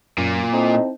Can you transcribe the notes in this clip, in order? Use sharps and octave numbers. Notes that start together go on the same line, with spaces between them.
F#2 A#2
C4 D#4 E4 A4